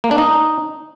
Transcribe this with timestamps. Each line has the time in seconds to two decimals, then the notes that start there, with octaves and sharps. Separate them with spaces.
0.04 A#3
0.11 D4
0.18 D#4